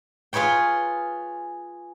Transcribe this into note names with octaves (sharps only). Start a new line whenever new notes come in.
F4 G#4 B4 C#5 G5